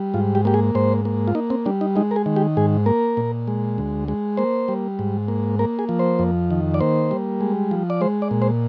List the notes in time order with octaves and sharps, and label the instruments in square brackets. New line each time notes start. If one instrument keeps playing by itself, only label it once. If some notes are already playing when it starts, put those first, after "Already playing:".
Already playing: [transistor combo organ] G3
G#2 F4
G4
A#3 G4
G#4
G#2 C5
A#3
F4
A#3 D#4
C4
G3 D4
D#4
G#3 D#4
A#4
G#4
D#3
G4
G#2 G#4
A#3 A#4
A#2
G#3
D2
G#3
A#3 C5
G3
G#2
A#3
A#3 A#4
G#4
F3
C5
F2
D#3
D5
A#3 C5
G3
G#3
F3
D5
G#3 C5
D5
A#2
C5